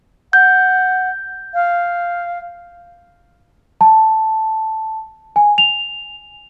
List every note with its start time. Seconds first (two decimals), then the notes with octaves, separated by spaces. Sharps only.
0.33 F#5 G6
1.54 F5
3.81 A5
5.36 G#5
5.58 F7